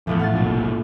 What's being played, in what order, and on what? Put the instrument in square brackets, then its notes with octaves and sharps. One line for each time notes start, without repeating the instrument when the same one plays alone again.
[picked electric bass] E2 [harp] A2 F3 A3
[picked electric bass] A1 [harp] F#5 F6 A6
[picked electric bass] F1 B1 A#2